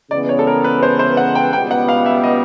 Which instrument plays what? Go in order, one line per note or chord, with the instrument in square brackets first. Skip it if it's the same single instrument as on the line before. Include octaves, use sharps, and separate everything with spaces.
[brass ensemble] C#3 E3 G#3 B3 [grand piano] D5
[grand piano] C#5
A4
A#4
B4
C5
C5
F#5
G5
[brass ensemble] C#2 B2 G3 B3 [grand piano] G5
[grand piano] F#5
F5
E5
D#5